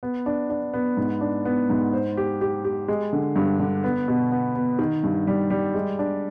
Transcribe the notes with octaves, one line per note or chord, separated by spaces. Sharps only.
B3
D4
D4
B3
G#2
D4
B3
G#2
C5
G4
G4
G4
G#3
D3
G2
D3
B3
B2
B3
B3
D#3
G2
G3
G3
G#3
D4